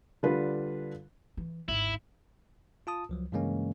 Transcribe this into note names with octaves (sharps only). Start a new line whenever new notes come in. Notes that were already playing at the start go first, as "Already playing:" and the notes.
D3 G3 F4 B4
E3
G#1 D2 E4
F4 A5 D#6
C#2 F3 F#3
G2 C#3 E3 G#3 A#3 C#4